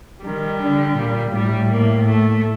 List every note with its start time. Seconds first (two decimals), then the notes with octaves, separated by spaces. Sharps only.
0.24 D#3 G3
0.61 D3
0.98 A#2
1.35 A2 G3
1.71 A#3
2.09 A3